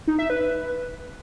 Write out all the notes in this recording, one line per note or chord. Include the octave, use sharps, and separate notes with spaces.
D#4
E5
B4